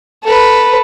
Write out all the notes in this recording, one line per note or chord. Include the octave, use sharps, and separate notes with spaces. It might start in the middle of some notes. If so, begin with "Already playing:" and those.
A4 B4